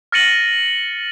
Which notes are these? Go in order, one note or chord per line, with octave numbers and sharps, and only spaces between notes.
F6 A6 A#6 C#7 D#7 F#7